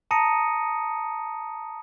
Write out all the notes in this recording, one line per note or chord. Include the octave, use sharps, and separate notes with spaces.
A5 A#5 D#6 A#6 C#7 D#7